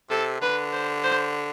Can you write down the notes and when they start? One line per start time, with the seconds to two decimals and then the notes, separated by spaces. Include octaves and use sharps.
0.10 C3 A4
0.41 D3 B4
0.73 C5
1.04 C5